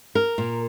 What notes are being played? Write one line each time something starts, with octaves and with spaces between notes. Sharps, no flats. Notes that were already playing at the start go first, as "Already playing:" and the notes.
A#4
A#2